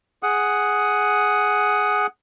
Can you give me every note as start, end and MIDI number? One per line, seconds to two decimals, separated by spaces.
0.23 2.07 68
0.23 2.07 78
0.23 2.07 87